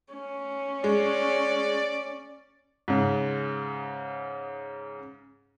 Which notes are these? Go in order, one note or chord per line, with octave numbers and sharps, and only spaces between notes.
C#4
G#3 D5
G#2 C#3